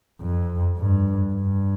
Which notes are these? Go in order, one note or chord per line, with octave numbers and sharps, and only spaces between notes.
F2
G2
G2